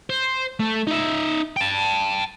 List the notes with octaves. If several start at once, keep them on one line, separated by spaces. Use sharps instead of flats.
C5
A3
D#4 E5
G5 A5